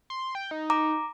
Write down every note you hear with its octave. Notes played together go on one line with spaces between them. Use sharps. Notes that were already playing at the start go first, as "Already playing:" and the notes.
C6
G5
D#4
A#5 D6